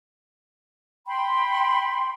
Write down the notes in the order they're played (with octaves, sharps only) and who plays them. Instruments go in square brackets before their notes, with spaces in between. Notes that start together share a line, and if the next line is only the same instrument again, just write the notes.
[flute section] G5 B5 C6